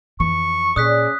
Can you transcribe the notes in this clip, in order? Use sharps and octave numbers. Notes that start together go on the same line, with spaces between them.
F2 E3 C#6
A#2 C#4 G#4 D5 D#6 F#6 B6